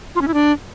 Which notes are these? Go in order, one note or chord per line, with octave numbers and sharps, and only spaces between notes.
F4
C#4
E4
D4